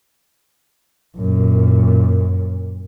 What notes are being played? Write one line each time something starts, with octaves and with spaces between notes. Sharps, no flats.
F#2 A#2